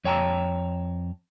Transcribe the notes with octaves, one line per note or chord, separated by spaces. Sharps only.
F2 C#5 G5 A5 A#5